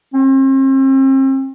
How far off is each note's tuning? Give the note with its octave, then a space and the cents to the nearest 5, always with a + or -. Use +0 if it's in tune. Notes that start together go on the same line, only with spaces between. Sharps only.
C4 +40